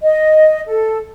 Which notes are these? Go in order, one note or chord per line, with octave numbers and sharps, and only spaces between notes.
D#5
A4